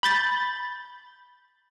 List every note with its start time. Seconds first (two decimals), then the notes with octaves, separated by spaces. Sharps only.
0.03 B5 G6 A6